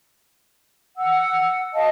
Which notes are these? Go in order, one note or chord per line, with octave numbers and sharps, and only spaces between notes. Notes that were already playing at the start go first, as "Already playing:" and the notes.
F#5 E6
D#5 F5 A5